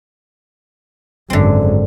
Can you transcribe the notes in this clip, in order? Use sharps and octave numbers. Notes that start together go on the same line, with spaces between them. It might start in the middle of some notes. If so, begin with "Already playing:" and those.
G#1 F#2 D3 C4